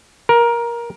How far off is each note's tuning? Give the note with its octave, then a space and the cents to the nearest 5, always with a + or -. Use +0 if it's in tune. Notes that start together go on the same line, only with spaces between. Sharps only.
A#4 +15